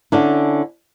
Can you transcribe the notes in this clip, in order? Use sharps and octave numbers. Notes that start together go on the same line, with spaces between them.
D3 C#4 D4 E4